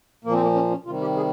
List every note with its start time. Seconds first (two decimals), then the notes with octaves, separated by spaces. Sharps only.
0.24 A#2 F3 A#3
0.33 C4
0.42 A#3
0.55 C#4
0.71 C#4
0.85 C3 D#3 G3 F4
1.01 G4
1.17 G#4